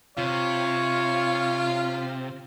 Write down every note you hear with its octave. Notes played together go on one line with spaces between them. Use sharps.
C3 F4 C#5